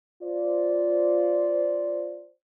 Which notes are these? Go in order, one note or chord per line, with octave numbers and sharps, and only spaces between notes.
F4 C5 D5